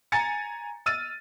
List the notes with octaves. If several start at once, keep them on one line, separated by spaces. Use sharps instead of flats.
G#5 A#5 A6 C#7
E6 F6 A6 D#7